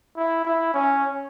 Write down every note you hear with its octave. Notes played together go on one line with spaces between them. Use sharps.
E4
E4
C#4